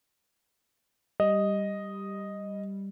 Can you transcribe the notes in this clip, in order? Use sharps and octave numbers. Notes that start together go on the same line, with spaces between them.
G3 D#5